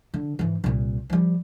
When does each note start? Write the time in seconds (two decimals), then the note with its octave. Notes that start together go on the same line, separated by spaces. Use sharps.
0.14 D3
0.39 G#2 E3
0.64 C2 A#2
1.10 F3 G3